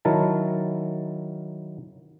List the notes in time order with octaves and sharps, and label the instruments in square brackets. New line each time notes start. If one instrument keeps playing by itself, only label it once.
[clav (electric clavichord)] D#3 F#3 E4 A#4 A5